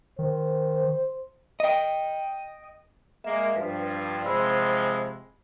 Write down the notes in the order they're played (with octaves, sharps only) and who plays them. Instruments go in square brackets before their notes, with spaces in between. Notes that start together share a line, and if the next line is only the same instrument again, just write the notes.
[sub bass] D#3 [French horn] C5
[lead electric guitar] D#5 G5
[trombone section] G#3 A#3 [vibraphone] E5
[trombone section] G2 F3 [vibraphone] B4
[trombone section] C3 F3 G#3 [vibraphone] C5 B5 E6